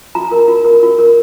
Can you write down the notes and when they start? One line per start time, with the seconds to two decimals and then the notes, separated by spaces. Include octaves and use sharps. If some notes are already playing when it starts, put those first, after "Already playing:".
0.15 F4 A#5
0.31 A#4
0.48 F4
0.65 A#4
0.83 F4
0.99 A#4